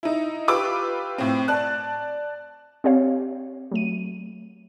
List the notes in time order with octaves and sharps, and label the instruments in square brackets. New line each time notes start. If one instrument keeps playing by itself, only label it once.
[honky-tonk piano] D#4 E4
F4 G4 B4 D6 E6
A2 C4
D5 A5 F#6
[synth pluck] C4 G4 C#5 F5
F#3 A3 D#7